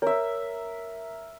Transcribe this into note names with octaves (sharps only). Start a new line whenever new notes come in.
A#4 C#5 E5